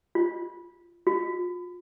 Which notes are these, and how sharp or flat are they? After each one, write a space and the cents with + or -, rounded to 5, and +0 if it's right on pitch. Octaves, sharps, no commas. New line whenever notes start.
F4 -15
F4 +35